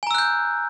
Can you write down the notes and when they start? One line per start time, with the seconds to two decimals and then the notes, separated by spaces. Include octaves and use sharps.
0.03 G#5
0.07 A#5
0.11 E6
0.15 F#6
0.18 G6